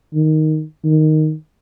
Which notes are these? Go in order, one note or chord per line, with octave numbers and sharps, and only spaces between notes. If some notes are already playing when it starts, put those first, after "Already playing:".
D#3
D#3